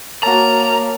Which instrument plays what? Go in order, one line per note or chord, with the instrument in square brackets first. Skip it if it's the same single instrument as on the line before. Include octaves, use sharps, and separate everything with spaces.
[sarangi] A#3 [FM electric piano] F#4 A5 [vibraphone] C#5 [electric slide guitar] A#5